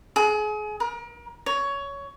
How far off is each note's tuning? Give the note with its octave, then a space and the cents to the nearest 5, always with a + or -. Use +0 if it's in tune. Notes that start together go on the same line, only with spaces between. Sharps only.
G#4 +30
A#4 +35
C#5 +15